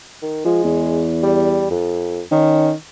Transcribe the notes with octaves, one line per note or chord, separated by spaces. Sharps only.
D#3
F3 G#3
E2
G3
F2
D#3 C#4